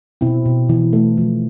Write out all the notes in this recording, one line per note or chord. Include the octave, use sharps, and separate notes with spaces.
B2 C4 E4
B2
E3
A3
F3